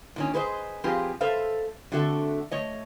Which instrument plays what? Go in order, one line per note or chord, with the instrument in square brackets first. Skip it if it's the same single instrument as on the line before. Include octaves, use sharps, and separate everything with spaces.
[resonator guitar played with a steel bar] A#2 D#3 C#4
G#4 B4 C5 D5 D#5
F3 C4 F4 G4 G#4 B4
A4 B4 C5 E5 F5
D3 A3 C4 F#4 A4 E5
A3 C#5 D#5